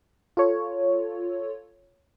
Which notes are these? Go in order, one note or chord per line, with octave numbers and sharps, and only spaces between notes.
F4 A4 C#5